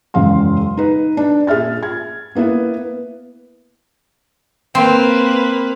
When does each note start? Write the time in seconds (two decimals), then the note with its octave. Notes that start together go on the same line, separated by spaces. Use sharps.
0.14 E1 F#2 C#3 F5 C6
0.77 D#4 B4
1.17 D4
1.47 A#2 G#4 E5 F6 A6
1.83 G#6
2.35 A#3 B3 E4 B4
4.75 A#3 C4 B4